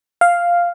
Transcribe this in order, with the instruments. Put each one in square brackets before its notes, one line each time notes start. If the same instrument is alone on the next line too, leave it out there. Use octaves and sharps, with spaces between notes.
[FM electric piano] F5